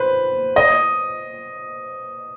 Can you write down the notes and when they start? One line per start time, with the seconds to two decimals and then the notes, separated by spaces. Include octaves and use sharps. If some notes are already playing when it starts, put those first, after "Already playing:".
Already playing: B4 C5
0.56 D#5